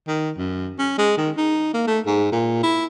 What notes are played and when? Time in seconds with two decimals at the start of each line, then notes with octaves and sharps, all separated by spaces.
0.08 D#3
0.37 F#2
0.79 C#4
0.98 G#3
1.17 D#3
1.37 D#4
1.74 A#3
1.87 A3
2.06 G#2
2.32 A#2
2.63 E4